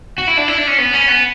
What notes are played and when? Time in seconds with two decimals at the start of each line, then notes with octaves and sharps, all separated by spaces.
0.18 F#4
0.27 E4
0.37 D4
0.48 E4
0.58 D4
0.67 C#4
0.78 B3
0.93 C#4
1.08 B3